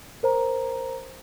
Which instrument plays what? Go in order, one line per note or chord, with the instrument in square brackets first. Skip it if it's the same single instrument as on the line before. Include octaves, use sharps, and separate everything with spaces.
[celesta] A#4 C5 A#5